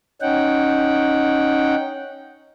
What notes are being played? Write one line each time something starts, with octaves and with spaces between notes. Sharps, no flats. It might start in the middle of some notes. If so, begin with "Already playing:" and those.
C#4 D#4 F#5 G5